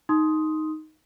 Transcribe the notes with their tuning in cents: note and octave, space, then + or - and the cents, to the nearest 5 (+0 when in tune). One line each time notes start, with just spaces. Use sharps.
D#4 +0 C6 +0 D#6 +5